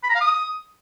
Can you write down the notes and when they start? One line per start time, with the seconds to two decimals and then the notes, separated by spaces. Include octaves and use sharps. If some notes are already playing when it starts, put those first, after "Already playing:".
0.04 B5
0.09 A#5
0.15 F5
0.21 D#6